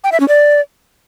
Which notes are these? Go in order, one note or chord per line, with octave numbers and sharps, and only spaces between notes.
G5
E5
C#4
D5